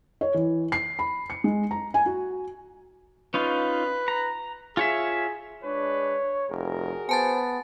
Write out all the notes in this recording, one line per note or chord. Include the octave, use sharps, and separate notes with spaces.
C#5
E3
C7
B5
C#7
G#3
A#5
G#5
F#4
C#4 D#4 F4 B4
A#5
F4 G#4 C#5 E5
G#3 D4 B4 C#5
F1 F#4 G#4 A#4
B3 C5 G#5 A5 A6